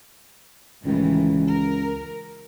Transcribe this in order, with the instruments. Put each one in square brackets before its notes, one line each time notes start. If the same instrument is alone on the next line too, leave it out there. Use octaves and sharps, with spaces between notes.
[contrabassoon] C#2 [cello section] A2 D#3 E3
[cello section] A#4